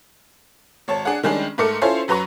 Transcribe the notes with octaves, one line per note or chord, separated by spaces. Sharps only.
G#1 C#5 A5
D4 G#4 F#5
D#3 G3 G#3 C#4 D4
G#2 A3 A4 A#4 D6 C#7
C#4 E4 F4 A4 C5 C#5
F#2 F#3 B4 A#5 C#6